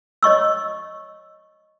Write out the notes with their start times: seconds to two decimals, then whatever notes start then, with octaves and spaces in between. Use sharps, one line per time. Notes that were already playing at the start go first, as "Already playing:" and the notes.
0.23 C#5 D#5 C#6 E6